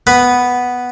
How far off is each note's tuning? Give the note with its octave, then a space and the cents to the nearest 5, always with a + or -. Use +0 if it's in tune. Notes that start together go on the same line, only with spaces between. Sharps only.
B3 +0 B4 +0